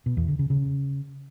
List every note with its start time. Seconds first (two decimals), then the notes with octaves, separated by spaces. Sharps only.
0.06 B2
0.17 E2
0.28 D3
0.39 C#3
0.50 C#3